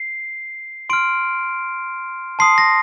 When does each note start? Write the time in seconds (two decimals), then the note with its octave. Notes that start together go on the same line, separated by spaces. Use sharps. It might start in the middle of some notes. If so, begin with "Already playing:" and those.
Already playing: C7
0.90 C6 F6 D7
2.39 A5 C6 D#6 C7
2.58 A#6